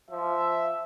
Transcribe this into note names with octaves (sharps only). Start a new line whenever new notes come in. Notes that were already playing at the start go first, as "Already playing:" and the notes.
F3 E5